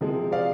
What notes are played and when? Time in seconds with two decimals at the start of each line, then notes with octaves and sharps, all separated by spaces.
0.01 C3 F3 G#3
0.32 D5 F5